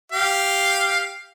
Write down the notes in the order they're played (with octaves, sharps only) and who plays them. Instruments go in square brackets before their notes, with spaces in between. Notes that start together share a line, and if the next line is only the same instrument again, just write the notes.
[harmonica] G4 F5